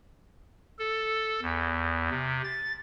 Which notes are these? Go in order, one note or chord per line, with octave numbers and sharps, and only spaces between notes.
A4
E2
C3
A6